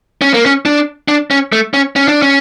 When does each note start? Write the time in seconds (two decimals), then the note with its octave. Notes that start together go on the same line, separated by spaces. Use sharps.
0.22 C#4
0.34 A#3
0.46 C#4
0.66 D4
1.08 D4
1.31 C#4
1.52 A3
1.74 C#4
1.96 C#4
2.08 D4
2.22 C#4